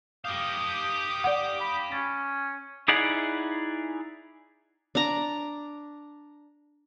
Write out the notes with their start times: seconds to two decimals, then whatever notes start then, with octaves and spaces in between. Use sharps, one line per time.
0.25 G4 F5 D6 D#6 G6
1.24 D5 F#5
1.61 B5
1.92 C#4 A6
2.88 D#4 E4 G#4 D5 F#5
4.95 D4 A#5